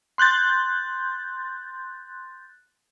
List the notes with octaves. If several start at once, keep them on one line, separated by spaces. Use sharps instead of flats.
C6 F#6 G6 A6